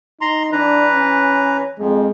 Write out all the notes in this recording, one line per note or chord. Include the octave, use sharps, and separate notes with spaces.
D#4 A#5 C6
E3 D4 B4 A#5
C#4
F2 G#3